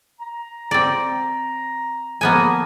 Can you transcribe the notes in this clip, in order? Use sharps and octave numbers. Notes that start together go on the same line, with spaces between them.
A#5
C4 D5
F3 A#3 B3 G#5